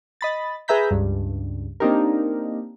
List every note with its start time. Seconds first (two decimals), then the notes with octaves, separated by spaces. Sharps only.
0.21 D#5 B5 A6
0.68 G#4 B4 E5 A#5 G6 B6
0.91 C#2 G2
1.80 A#3 C4 D4 D#4 G4 A#4